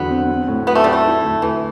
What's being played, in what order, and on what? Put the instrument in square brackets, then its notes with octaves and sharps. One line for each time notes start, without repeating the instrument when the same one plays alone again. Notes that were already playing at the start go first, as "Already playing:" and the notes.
Already playing: [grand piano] E2 D3 F#3 [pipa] B3
[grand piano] C4
C4
A2
[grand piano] F#3 [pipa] B3
[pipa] A3
[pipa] G3 [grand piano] E4
[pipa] A3
[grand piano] E4
D2
[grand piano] D2 [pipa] E3